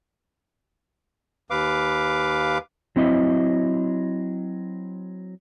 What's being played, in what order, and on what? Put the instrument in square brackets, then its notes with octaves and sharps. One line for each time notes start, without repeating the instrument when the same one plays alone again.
[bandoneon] D#2 B4 F5 D6
[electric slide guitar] F#3 C4 E4 D#5 E5